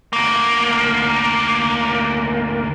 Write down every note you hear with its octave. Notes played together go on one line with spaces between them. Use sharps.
D2 A#3